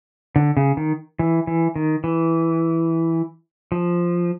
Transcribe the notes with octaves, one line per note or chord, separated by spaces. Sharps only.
D3
C#3
D#3
E3
E3
D#3
E3
F3